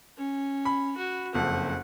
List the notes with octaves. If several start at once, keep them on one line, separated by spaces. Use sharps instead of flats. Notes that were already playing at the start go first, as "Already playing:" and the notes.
C#4
B5
F#4
F#1 F2 F#5